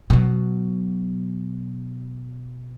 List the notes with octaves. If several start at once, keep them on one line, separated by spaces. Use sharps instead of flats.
B2 F#3